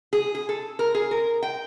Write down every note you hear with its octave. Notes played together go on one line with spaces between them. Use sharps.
G#4
G#4
A4
A#4
G#4
A#4
G5